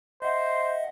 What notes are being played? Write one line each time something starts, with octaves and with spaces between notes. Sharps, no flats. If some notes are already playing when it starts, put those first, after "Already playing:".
C5 D#5 E5 F#5